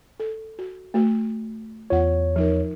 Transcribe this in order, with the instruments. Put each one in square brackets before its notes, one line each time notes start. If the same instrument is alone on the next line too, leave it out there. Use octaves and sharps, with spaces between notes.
[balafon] A4
F#4
A3 F#4
[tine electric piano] E2 C#5 [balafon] F4 F#5
[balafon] F3 D#4 A#4